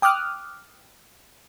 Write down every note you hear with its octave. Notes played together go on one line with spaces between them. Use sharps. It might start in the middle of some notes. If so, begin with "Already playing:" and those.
G5 D6 D#6 F6 F#6